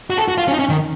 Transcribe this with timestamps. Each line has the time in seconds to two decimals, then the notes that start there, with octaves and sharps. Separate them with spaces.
0.10 F#4
0.18 A4
0.28 F#4
0.38 F4
0.48 C#4
0.54 D#4
0.59 C#4
0.69 D#3